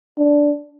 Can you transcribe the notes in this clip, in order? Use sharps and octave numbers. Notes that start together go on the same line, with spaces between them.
D4